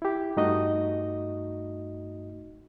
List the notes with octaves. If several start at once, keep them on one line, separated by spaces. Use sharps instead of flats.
E4 G4
G2 A3 D#4 F#4 D#5